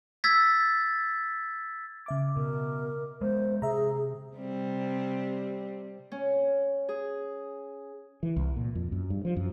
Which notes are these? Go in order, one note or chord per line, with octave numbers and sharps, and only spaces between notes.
E6 G#6 A6 B6
C#3 E5 D6
B2 A#4
G#3 B3 C5
C3 G#4 E5 A#5
C3 G3 C4
C#4
G#4
E3
C2
A#2
F2
F#2
G2
F3
F#2